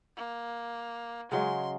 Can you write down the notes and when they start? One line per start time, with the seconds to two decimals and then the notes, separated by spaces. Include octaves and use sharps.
0.16 A#3
1.32 C#3 F#3 G#3 C6